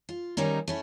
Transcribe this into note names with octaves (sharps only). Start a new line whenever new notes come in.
F4
D#3 G3 A#3 C#4 D#4
A3 C#4 E4